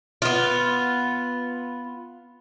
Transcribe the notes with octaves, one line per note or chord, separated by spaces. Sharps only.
B3 F4